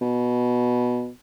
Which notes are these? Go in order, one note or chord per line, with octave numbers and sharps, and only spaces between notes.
B2